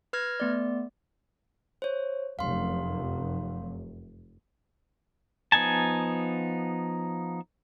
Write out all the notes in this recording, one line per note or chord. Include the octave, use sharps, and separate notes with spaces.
B4 F6 G#6 A#6
A3 B3 D5
C5 C#5
F1 F#2 F5 C6
F3 B3 D#4 G#5 A5